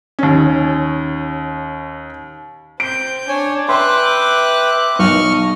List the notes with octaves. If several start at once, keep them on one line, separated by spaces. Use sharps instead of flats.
D#2 C#4
C4 G6 D7
D4 C#5 G#5
B4 E5 G5 C6 D6 F#6
B1 D#5 C#6 F6